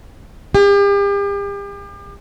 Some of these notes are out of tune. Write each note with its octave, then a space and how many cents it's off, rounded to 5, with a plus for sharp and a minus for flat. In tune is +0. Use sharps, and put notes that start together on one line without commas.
G4 +40